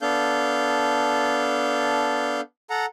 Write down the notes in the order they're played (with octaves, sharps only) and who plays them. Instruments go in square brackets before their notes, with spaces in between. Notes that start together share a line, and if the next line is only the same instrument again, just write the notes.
[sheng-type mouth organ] B3 D4 A4 F5 G6
A4 F#5 A#5